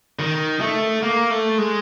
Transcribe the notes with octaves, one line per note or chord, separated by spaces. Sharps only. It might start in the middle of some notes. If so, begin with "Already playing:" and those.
D#3
A3
A#3
A3
G#3